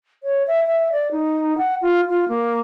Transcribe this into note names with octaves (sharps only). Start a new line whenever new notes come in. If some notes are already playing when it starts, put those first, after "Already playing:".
C#5
E5
E5
D5
D#4
F#5
F4
F4
A#3